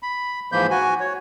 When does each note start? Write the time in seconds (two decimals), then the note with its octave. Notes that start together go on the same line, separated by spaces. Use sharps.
0.03 B5
0.52 G#2 E3 F3 A#3 B5 G6
0.70 F#4 G#5
1.00 C#5